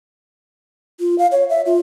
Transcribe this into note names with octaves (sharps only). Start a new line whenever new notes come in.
F4
F5
C#5
E5
F4